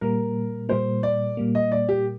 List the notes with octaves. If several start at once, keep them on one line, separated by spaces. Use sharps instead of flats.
A#2 G3 A#3 A#4
A#2 G3 A#3 C5
D5
A#2 G3 A#3
D#5
D5
G4